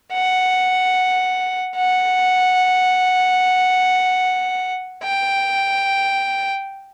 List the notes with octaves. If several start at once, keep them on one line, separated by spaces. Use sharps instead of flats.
F#5
F#5
G5